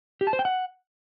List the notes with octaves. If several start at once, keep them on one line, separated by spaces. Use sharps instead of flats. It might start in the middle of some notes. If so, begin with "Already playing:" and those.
G4
A5
C5
G5
F#5